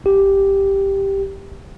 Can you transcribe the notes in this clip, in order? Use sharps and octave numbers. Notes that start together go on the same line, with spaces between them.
G#1 G4